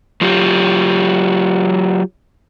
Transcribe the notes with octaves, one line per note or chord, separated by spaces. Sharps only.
F#3 F4 G4